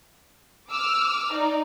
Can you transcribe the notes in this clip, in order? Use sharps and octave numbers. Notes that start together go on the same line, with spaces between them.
D6 E6 F6
D#4 D5